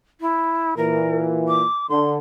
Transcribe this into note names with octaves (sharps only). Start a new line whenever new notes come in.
E4
A#2 E3 A#4
D6
D3 C6